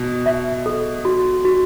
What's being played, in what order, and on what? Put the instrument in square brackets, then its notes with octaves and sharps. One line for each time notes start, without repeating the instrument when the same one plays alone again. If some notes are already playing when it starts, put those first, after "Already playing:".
Already playing: [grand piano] B2
[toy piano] E5
A4
F#4
F#4